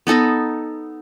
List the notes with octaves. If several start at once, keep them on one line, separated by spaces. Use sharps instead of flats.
B3 D#4 A4 D#5